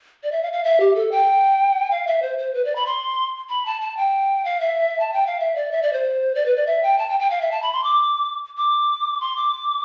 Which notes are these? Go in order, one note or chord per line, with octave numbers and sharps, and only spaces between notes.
D5
E5
F5
F5
E5
G4
A4
G5
F5
E5
C5
C5
B4
D5
B5
C6
B5
A5
A5
G5
F5
E5
A5
G5
F5
E5
D5
E5
D5
C5
D5
B4
D5
E5
G5
A5
G5
G5
F5
E5
A5
B5
C6
D6
D6
C6
D6